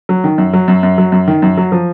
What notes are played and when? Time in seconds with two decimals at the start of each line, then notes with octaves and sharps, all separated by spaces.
0.09 F#3
0.24 D#3
0.38 F#2
0.53 F#3
0.68 F#2
0.83 F#2
0.98 F#3
1.12 F#2
1.28 D#3
1.42 F#2
1.57 F#3
1.72 F3